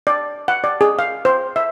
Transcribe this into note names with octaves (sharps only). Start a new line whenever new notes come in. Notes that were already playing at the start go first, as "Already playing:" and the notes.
D5
F#5
D5
G#4
F5
C5
E5